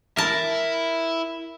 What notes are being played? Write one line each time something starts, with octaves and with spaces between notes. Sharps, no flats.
E4 A#4 E5 A5